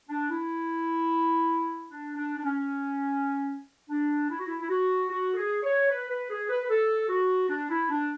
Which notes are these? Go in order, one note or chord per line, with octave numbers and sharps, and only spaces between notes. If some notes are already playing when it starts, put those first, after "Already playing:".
D4
E4
D4
D4
D4
C#4
D4
E4
F#4
E4
E4
F#4
F#4
A4
G#4
C#5
B4
B4
G#4
B4
B4
A4
F#4
D4
E4
D4